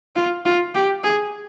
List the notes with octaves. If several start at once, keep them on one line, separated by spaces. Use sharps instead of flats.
F4
F4
G4
G#4